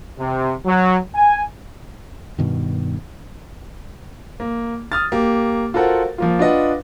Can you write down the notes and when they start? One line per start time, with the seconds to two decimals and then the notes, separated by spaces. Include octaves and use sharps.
0.19 C3
0.65 F#3
1.15 G#5
2.39 G2 B2 D#3
4.40 A#3
4.92 D#6 F6 A6
5.12 A#3 G4
5.74 F4 F#4 A4 A#4 C5 F#5
6.18 F3 A#3 F4
6.39 D4 F4 B4 D#5 F#5